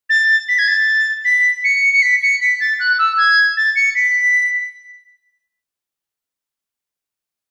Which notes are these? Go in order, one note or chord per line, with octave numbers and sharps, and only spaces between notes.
A6
B6
G#6
A6
B6
C#7
C#7
B6
C#7
B6
A6
F#6
E6
G#6
A6
C#7
B6